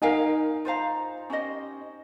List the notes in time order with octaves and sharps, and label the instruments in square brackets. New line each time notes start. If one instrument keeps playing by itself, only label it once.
[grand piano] D#4 [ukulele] A#4 F5 G#5
[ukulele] F4 C5 F5 A#5
C#4 G4 C5 D#5